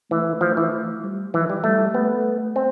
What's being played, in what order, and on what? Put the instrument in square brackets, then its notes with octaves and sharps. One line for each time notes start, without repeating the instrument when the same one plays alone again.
[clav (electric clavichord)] E3 [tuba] A3
[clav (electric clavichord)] F3 [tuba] A3
[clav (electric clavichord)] E3
[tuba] G3
[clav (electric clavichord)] E3 [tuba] F3
[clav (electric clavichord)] G3
[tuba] G3 [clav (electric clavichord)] A3
[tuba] A3 [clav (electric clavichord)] B3
[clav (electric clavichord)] C4